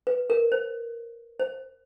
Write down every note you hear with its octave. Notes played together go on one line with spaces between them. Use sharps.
B4
A#4
C5
C5